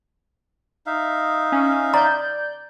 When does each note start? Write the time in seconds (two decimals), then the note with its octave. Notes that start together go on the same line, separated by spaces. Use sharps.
0.87 D#4 E5 F5
1.52 C#4
1.94 D5 A#5 G6